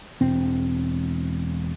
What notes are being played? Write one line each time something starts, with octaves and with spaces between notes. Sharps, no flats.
E1 C4